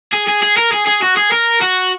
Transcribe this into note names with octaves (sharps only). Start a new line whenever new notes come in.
G#4
G#4
G#4
A#4
G#4
G#4
F#4
G#4
A#4
F#4